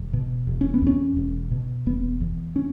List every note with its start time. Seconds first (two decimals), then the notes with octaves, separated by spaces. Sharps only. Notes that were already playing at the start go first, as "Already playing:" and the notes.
Already playing: E1
0.13 B2
0.47 E1
0.61 C#4
0.74 B3
0.82 E2 C#4
1.17 E1
1.51 B2
1.86 E1 B3
2.21 E2
2.56 C#4